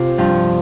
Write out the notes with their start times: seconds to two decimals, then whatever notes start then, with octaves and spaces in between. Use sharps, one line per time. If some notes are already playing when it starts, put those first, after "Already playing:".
Already playing: C3 F4
0.18 G2 F3